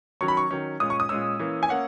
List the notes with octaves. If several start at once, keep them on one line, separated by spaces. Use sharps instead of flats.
D#3 F#3 C#4 C#6
B5
C#6
D#3 F#3 C#4
A#2 G#3 C#4 D#6
C#6
D#6
A#2 G#3 C#4 E6
E3 A#3 C#4
G#5
A#3 C#4 F#5